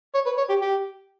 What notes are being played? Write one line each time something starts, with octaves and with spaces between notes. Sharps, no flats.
C#5
B4
C#5
G4
G4